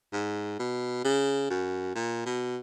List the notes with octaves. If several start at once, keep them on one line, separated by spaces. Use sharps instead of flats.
G#2
B2
C#3
F#2
A#2
B2